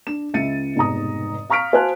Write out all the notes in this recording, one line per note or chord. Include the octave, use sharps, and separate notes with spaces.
D4 E7
C#2 G#3 E5 A6 C#7 D#7
F1 G#2 B2 A#5 D#6
F5 A#5 C#6 F6 B6 D7
F#4 C5 F5 G#5 A5 F#6